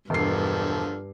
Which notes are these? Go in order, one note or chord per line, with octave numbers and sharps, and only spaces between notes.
E1 G2 D3 F3 F6 C7